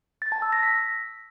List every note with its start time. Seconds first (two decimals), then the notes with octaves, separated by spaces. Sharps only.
0.22 A6
0.32 A5
0.42 E6
0.52 A#6
0.63 B6